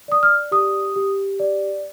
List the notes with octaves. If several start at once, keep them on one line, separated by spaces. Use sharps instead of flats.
D5 D#6
F6
G4 D#6
G4
D5